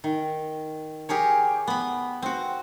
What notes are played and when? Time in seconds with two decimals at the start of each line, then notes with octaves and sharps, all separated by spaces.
0.04 D#3
1.09 G4 G#4 A#4 C#5
1.67 B3 B5
2.22 C4 F#4